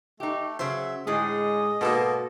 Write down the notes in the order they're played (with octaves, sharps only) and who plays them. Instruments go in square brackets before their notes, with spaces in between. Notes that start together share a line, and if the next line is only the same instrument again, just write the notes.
[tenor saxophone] A3 [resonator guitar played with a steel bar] D#4 G4
[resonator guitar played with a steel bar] C#3 F#3 [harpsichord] C5 [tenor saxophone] E5
[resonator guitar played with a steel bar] A2 D3 G#4 [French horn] G#3 [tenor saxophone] D#5
[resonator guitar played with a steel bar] G#2 A4 [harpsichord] B2 A#3